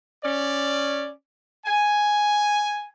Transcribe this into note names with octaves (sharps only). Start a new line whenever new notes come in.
C#4 D5
G#5